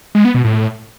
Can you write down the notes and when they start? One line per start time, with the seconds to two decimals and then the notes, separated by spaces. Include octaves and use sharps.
0.15 G#3
0.25 B3
0.35 B2
0.45 A2